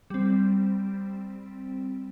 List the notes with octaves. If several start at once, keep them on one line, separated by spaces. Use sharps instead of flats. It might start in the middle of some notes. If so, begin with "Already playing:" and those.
G3 C4